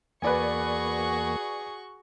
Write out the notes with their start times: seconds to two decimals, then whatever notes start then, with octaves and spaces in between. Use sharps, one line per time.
0.22 E2 A#3 F#4 G#4 B4 D5 G#5 C#6